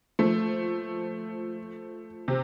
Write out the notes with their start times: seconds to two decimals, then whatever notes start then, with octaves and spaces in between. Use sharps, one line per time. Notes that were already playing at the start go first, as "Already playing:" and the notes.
0.19 F3 A3
2.28 C3